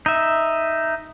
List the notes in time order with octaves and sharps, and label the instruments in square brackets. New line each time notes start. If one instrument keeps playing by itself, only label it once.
[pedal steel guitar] D#4 E5